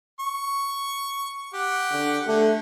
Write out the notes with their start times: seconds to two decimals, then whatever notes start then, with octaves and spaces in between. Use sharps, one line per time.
0.20 C#6
1.54 G4 F#5
1.92 D3
2.26 D3 A3